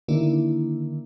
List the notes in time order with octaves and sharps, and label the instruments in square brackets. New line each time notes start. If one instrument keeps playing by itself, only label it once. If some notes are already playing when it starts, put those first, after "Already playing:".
[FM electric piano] D3 D#3 A#3 D4 E4